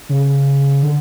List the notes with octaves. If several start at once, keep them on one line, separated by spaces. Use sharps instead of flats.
C#3
D3